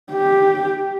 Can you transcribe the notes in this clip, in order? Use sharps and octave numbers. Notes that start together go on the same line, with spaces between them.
G4